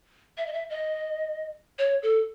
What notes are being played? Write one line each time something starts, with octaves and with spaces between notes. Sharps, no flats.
E5
D#5
E5
D#5
C#5
A4